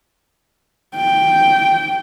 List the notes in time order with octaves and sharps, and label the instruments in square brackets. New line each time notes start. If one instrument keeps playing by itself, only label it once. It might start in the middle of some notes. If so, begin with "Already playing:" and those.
[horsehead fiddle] G5